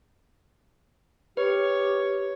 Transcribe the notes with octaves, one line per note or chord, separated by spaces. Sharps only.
G4 B4 C#5